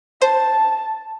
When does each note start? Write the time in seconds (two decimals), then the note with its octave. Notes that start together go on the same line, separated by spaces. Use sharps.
0.22 C5 A5